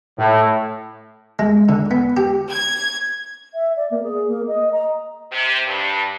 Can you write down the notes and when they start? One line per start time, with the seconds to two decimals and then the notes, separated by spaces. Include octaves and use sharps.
0.17 A2
1.39 G#3
1.69 D3
1.91 B3
2.17 G4
2.51 G#6
3.54 E5
3.76 D5
3.90 A#3
4.03 G#4
4.27 A#3
4.47 D#5
4.72 A#5
5.31 C3
5.66 G2